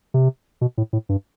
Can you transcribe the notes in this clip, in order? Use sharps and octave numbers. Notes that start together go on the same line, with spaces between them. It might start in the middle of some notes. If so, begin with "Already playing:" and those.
C3
B2
A2
A2
G2